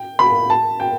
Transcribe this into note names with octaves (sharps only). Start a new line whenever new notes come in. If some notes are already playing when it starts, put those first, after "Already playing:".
Already playing: G5
B5
A5
G5